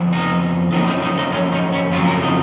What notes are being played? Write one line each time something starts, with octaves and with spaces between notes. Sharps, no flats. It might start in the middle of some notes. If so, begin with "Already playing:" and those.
Already playing: F2 F3 B3
D#4
F#2 F3 A#3 D#4
D#4
D#4
D#4
C#4
D#4
C#4
F2 C#3 F#3 F4
A#4
D#4